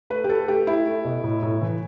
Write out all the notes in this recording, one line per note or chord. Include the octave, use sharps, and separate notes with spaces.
A3 B4
G4
A3 A4
A3 G4
A3 E4
A3
B2
A2
A2
E3